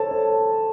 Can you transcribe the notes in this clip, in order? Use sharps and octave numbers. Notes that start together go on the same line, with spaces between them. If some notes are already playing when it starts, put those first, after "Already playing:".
Already playing: A4 C5 C#5
C#5